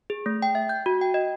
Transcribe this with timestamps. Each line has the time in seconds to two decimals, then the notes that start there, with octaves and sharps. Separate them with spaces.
0.10 G#4
0.26 A3
0.42 G5
0.55 E5
0.69 G6
0.86 F#4
1.01 G5
1.14 D#5